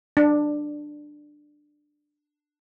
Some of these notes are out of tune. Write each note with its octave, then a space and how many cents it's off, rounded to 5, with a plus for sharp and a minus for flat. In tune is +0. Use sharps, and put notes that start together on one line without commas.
D4 +15